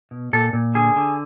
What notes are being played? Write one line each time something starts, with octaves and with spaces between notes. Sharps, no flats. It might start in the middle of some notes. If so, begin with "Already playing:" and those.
B2
A#2 A4
A#2
D3 G#4
D3